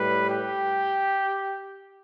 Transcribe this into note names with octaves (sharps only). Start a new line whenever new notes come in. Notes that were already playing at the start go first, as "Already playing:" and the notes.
Already playing: A2 G3 B4
G4